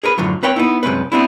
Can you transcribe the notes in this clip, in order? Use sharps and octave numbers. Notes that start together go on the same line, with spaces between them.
G#4 A#4 B4
F#2 A2 D3 F3 F#3
C4 B4 C#5 G5
B3 D#4 E4
C2 F#2 G#3 C4 C#4 B4
B3 C4 D4 E4